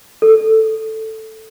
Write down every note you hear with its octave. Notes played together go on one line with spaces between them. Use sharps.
A4